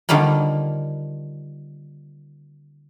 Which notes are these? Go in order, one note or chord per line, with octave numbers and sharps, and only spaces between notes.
D3 D#3 F3 G3 A#3